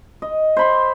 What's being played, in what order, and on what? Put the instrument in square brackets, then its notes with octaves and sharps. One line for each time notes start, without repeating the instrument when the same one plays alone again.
[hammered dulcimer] D#5
C5 B5 C6